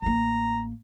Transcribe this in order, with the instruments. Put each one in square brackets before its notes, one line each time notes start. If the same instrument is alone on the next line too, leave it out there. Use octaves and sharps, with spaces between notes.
[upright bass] A1 A#3 [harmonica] A#5